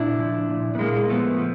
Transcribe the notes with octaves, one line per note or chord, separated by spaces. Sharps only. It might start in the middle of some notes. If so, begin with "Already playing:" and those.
Already playing: A#2 D4 E4
F3
A#2
B3
A#2 G#3 A#3
F3 A3 B3
F3